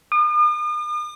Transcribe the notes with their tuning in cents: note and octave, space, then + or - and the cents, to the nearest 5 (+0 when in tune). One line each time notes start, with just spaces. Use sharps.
D#6 -45